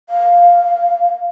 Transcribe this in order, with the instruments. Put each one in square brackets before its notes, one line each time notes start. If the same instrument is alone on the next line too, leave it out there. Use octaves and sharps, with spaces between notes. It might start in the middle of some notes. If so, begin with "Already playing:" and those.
[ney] F5